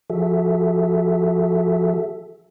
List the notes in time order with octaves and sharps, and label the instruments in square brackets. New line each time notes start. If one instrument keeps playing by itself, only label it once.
[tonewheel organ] F3 F#4 G#4 A4 E5